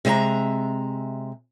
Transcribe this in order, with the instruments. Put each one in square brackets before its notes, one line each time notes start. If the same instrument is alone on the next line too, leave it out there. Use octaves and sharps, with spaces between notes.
[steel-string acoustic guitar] C3 G#3 D#5 E5 A#5